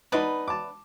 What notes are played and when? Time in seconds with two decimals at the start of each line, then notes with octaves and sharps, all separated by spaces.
0.12 B3 D4 D#4 B4 D#5 B5
0.48 A5 D6